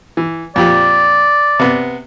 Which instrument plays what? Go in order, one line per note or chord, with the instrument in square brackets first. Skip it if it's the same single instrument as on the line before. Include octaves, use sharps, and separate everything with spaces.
[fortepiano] E3
[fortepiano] F2 A#2 G4 [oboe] D5
[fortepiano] C3 B3